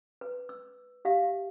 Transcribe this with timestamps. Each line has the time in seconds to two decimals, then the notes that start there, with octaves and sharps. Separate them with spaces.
0.21 B4
0.49 E6
1.05 G4 E5 F5